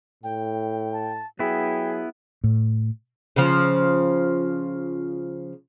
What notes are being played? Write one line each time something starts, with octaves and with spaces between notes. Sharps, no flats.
A2 G5
A5
F#3 B3 E4 G#4 G5
A2
C#3 F3